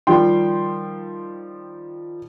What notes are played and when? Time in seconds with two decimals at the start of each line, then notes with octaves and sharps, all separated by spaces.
0.07 D#3 F3 G3 G5 C6